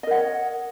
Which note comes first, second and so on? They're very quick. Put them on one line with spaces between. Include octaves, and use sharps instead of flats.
D#5 A#4 F#5 C#5